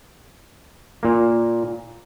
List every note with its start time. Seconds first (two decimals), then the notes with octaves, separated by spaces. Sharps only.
1.03 A#2 A#3